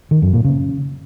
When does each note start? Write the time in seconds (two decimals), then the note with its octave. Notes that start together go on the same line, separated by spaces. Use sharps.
0.11 D#3
0.22 F#2
0.33 A#2
0.45 C#3